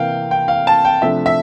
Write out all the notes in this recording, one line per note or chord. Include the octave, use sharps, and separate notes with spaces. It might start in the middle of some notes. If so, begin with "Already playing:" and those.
Already playing: C3 E3 A#3 F5 G5
G5
F5
A5
G5
C3 F3 A3 D4 E5
E5